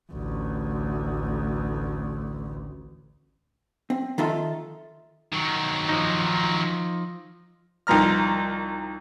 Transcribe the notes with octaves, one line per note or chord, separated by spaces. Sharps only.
A1 D2
C4
D#3 D#4 F4 A4 E5 C6
D#3 F#3
F3 D#4
C2 D#3 F3 A#5 F6